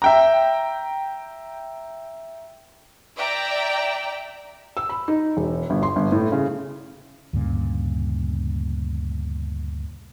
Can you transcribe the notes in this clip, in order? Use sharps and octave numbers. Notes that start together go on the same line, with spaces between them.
E5 G5 A#5
D5 E5 G5 A#5
E6
B5
D#4
E1
G1
C6
G1
A2
C#3
D2 G2 A#2 C#3